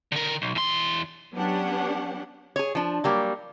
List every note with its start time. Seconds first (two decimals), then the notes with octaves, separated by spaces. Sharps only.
0.12 D3 A#4
0.42 B1
0.55 E2 C6
1.35 F#3 B3 C#4 D4 G4 F#5
2.56 G#4 C#5
2.75 F3 D4
3.04 F#3 G3 A#3